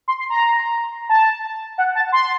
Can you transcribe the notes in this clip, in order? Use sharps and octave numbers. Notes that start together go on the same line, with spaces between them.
C6
C6
A#5
A5
F#5
A5
C6